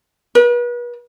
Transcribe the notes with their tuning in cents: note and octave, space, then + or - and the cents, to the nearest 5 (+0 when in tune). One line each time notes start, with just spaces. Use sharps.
B4 -40